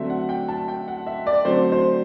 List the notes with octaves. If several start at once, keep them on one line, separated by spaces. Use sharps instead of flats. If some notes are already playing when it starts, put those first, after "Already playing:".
Already playing: D3 F#3 A3 C4 E5
F#5
G5
A5
G5
F#5
E5
D5
D3 F#3 A3 C4 C5
C5